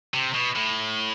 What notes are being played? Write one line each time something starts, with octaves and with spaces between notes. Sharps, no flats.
C3
B2
A2